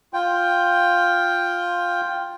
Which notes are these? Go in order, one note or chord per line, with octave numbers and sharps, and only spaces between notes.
F4 G5